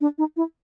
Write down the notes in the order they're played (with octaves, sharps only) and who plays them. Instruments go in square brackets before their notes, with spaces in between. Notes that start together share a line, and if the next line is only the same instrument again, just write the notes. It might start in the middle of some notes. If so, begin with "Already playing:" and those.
[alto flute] D4
D#4
E4